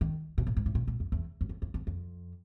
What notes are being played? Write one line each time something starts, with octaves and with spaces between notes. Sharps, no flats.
D#3
B2
A#2
G#2
A2
A#2
A#2
F2
E2
F#2
F2
E2
E2
F2